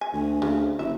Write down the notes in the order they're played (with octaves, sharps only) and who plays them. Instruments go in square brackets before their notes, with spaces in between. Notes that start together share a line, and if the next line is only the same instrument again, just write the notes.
[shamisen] G#5
[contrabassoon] D2
[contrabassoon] D2 [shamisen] C#3
[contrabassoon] F#1 [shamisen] E5